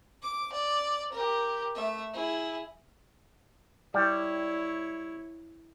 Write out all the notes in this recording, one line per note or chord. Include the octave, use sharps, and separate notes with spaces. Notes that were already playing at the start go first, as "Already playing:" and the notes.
D6
D5
G4 A#4
A3 E5
E4 G#4
G3 E4 C#5